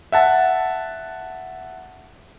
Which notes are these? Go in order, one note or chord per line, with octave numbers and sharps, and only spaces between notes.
E5 F#5 A5